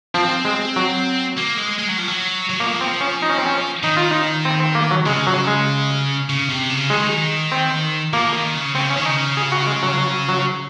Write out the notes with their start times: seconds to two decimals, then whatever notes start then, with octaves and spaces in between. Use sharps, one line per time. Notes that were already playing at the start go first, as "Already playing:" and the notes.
0.14 F3 C4
0.45 G#3
0.76 F#3
1.38 A#3
1.58 G#3
1.79 G#3
1.89 F#3
1.99 F3
2.08 F#3
2.49 F#3
2.60 F3 A#3
2.81 C4
3.01 C#4
3.22 D#4
3.30 C#4
3.38 C4
3.46 C#4
3.83 D#3 D#4
3.97 F4
4.11 D#4
4.45 C4
4.60 C4
4.75 A#3
4.91 F#3
5.06 C#3 G#3
5.27 F#3
5.47 G#3
6.30 C#3
6.49 C3
6.70 C#3
6.90 D#3 G#3
7.52 C4
8.13 F3 A#3
8.35 D#3
8.54 C#3
8.75 C#3 C4
8.90 C#4
8.97 D#3
9.06 C#3 D#4
9.37 G#4
9.52 F#4
9.67 G#3
9.83 F#3
9.97 F#3
10.29 F#3